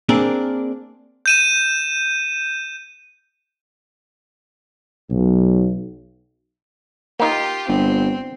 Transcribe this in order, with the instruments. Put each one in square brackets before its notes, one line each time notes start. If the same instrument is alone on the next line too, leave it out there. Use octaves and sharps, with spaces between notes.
[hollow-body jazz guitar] A#3 C4 D4 G#4 A#4
[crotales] G6 D#7 E7
[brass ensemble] B1
[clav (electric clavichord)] A#3 D#4 [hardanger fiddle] F4 G4
[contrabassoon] G1 [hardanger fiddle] C4